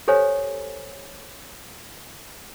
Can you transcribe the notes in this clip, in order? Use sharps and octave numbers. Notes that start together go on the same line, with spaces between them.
G4 A4 C5 C#5 G#5